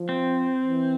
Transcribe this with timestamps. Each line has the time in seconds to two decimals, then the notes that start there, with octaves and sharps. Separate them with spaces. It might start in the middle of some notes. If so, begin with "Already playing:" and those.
Already playing: F3
0.09 C4
0.64 E3